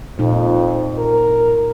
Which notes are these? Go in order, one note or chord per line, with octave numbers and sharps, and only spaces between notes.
F2 A#2 D#4
A#4